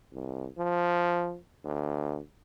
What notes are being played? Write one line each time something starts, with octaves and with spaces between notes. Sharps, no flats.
C2
F3
D2